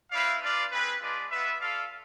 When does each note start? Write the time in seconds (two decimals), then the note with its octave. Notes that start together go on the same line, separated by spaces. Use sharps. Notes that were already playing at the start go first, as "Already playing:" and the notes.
0.11 C4 E4 B4 D5 F5
0.42 D4 F4 B4 D5 F5
0.71 C4 G#4 B4
1.01 G#3 D4 F4 B4 D5
1.31 B3 F4 B4 E5
1.60 F4 A4 D5 F5